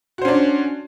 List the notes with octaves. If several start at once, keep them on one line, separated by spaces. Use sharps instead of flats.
C#4 D4 F#4 C5